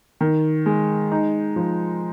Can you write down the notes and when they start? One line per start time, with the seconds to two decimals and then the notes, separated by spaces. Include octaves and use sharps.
0.21 D#3
0.66 G#3
1.12 D#4
1.56 F3